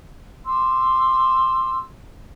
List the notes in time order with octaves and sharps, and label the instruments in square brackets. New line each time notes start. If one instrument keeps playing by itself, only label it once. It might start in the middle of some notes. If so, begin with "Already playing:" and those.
[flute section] C6 D6 E6